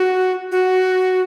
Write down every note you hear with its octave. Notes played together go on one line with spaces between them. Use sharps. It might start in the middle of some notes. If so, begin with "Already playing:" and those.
Already playing: F#4
F#4